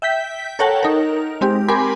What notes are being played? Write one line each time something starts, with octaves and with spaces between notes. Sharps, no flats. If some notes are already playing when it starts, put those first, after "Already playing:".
E5 G5 G6 B6
A4 A#4 C#5 F#5 G5 A5
D#4 A#4
G#3 C4 G4
G4 A#4 G#5 B5 C6 D6